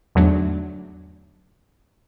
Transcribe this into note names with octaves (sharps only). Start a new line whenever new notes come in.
E2 G#2 D3 F#3 A3 D4